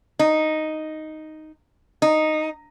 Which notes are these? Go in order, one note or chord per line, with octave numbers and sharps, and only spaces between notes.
D#4
D#4